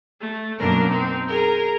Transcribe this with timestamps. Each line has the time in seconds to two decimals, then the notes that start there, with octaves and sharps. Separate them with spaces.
0.20 A3
0.58 F#2 B2 A#3 D4 A#4
0.88 C4 D#4
1.27 G#4 A#4 A#5